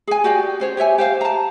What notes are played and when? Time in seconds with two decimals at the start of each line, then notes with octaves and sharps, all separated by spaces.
0.07 G#4 G#5
0.24 F#4 G4 D5 G5
0.60 C#4 C5 C#5
0.77 G4 C#5 E5 G#5
0.98 G4 C5 F5
1.21 A5 A#5